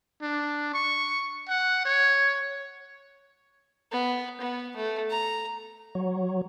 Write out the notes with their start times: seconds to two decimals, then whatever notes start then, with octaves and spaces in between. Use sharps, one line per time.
0.22 D4
0.74 C#6
1.49 F#5
1.85 C#5
3.92 B3
4.40 B3
4.76 A3
5.10 A#5
5.95 F#3